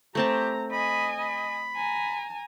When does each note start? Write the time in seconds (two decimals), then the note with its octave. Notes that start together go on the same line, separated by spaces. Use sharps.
0.15 A3 C4 G4 A5 A#5
0.71 D#5 G#5 B5
1.20 B5
1.76 G#5 A#5